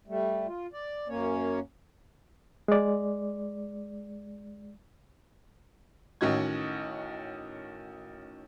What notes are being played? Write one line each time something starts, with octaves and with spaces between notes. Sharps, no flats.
G3 A3
F4
D5
F#2 A#3 C#4 C#5
G#3 D5
A1 D#3 C#4 F#4 D#5 G#6